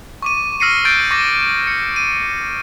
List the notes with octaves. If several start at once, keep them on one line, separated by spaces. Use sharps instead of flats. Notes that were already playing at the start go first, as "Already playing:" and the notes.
C#6 D6 D#7
E6 F6 A#6 C7 C#7 D#7
C#6 E6 G6 A6 D7
C#6 D6 A6 A#6
C#7
D#7